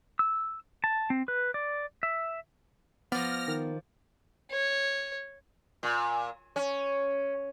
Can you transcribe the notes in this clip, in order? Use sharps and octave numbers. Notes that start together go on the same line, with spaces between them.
E6
A5
C4
B4
D5
E5
F3 B3 D5 F6 A#6
D#3
C#5
A#2
C#4